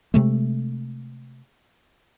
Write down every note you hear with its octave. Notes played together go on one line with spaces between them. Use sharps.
C3 G#3 A3